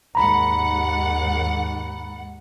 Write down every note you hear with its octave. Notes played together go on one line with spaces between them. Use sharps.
D#2 G#2 F#5 A#5 B5